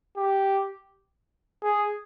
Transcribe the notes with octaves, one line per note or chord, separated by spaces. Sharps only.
G4
G#4